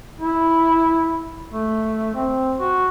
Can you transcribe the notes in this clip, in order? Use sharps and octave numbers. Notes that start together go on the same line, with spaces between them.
E4
A3
C4
F#4